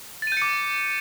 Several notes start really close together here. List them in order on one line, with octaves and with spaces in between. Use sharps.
A6 D#7 G6 C#7 D6